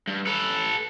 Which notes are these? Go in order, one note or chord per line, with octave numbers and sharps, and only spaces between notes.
G2
A4 B4